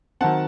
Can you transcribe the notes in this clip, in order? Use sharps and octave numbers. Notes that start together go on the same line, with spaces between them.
D#3 F#3 C4 F#5 A5